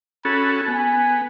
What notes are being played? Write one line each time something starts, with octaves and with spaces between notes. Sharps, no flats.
C#4 F#4 A4 B5
B3 G#5